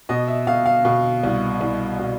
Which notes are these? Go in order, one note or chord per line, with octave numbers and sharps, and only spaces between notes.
B2 D#5
E5
B2 F5
F5
B2
C2
C2
B2